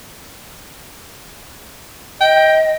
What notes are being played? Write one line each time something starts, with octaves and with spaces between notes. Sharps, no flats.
D#5 G5